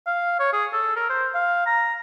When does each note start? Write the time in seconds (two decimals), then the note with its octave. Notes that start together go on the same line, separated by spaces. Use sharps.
0.06 F5
0.39 C#5
0.53 G#4
0.73 A4
0.96 A#4
1.09 C5
1.35 F5
1.66 A#5